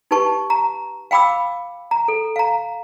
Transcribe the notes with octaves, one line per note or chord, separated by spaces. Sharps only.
D#4 G4 B4 A5 C#6
A#5
F5 G5 B5 D6 E6
A#5
A4
F5 A#5